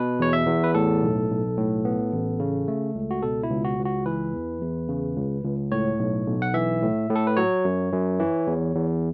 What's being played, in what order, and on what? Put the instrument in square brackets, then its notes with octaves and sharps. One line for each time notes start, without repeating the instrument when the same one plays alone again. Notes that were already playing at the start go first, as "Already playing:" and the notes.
Already playing: [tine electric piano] B2 B4
E2 C#5
E5
E2
B4
A2 A4
B1
B1
A2
B3
A1
C#3
A3
C#2
F#4
B2 A4
E4
C#2
F#4
C#2
F#4
E3 B4
E2
E2
C#3
C#2
C#2
A2 C#5
B1
B1
F#5
E3 E5
A2
A2
A4
B4
F#3 C#5
F#2
F#2
E3
E2
E2